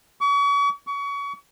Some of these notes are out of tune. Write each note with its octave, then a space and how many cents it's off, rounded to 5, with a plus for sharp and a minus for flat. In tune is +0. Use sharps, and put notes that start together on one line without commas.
C#6 +40
C#6 +30